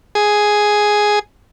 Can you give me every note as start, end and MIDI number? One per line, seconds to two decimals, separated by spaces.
0.15 1.19 68